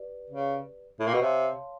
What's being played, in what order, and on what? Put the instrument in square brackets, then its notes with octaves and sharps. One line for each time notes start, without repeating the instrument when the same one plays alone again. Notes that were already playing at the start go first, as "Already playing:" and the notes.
Already playing: [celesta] G4 B4 D5
[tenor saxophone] C#3
A2
A#2
B2
[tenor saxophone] C3 [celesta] C#5 F5 A5 C6